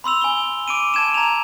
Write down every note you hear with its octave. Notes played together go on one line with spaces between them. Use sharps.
B5 C6 E6 F7
G#5 G7
D6 D7 D#7
A5 G#6 E7
A#5 F7